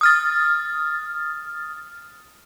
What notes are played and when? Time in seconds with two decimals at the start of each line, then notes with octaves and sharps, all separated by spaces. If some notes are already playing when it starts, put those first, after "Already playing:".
0.01 D#6 F6 A6